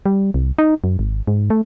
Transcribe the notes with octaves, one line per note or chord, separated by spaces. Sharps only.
G3
C2
D#4
F#2
G#1
G#2
A3